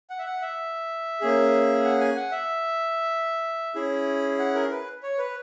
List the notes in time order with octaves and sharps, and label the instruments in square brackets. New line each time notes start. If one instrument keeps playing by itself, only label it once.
[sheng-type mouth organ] F#5
E5
F#5
E5
A#3 C#4 G#4
F#5
G#5
F#5
E5
C#4 E4 G#4
F#5
A#4
B4
C#5
B4